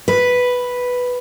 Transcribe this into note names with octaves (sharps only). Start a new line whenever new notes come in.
B4